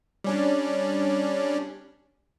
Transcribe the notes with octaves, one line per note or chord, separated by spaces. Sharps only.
G3 C#4 D4